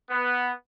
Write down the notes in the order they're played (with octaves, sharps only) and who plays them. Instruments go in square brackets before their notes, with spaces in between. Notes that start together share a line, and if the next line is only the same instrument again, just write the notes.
[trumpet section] B3